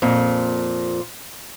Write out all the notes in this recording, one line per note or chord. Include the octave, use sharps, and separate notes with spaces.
F2 A#2